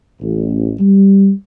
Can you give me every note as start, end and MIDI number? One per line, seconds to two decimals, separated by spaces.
0.21 0.74 33
0.79 1.30 55